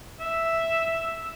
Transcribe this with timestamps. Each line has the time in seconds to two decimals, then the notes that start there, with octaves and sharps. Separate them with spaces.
0.20 E5